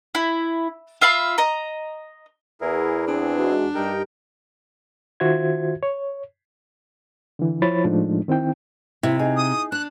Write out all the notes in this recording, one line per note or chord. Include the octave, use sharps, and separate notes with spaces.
E4
F4 E5 F5 B5
D#5 A#5
E2 E4 G#4 A#4
C4 D4 G#4
G#3 D#4 F#4
G2 D#4 G4 A#4 G5
D#3 F4 F#4 C5 E5 G#6
C#5
D3 E3
F3 E4 C5 C#5 B5 A6
A2 F3 G#3 A3 D4 D#4
D#3 C4 E4 G5
C3 E4
D#4 G#4
D#6
D4 F#6